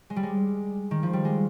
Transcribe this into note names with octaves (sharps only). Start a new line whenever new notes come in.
G#3
G3
G#3
D#3
F3
G3
G#3